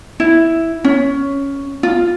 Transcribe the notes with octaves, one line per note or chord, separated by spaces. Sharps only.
E4
C#4
F4